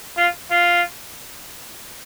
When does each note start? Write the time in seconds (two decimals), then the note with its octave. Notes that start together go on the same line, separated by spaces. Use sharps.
0.17 F4
0.51 F4